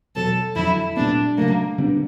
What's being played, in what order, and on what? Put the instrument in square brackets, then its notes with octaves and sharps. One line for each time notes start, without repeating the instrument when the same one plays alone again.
[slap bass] E2 B2 F#3 [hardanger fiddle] A4
[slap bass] F2 D3 F#3 [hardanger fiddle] E4
[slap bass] A#2 G3 B3 [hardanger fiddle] D4
[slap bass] C#3 F#3 A3 [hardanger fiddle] A#3
[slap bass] D3 G3 B3 D4